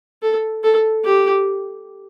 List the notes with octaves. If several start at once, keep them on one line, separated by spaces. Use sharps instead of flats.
A4
A4
G4